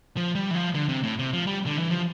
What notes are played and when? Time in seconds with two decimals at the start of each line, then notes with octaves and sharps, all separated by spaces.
0.17 F3
0.35 G3
0.51 E3
0.55 F3
0.75 D3
0.89 C3
1.03 A2
1.19 C3
1.33 F3
1.47 G3
1.66 D3
1.77 E3
1.91 F3